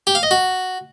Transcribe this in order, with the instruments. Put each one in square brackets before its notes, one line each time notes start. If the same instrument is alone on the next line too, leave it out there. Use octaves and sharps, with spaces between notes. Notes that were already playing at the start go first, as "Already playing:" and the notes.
[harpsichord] G4
F5
D#5
F#4